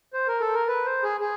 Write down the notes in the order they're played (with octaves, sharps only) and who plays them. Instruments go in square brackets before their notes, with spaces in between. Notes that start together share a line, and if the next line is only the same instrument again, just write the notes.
[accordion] C5
A#4
A4
A#4
B4
C5
G#4
G#4